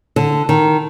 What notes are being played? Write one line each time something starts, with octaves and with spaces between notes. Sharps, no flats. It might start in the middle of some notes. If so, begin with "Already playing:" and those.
D3
D#3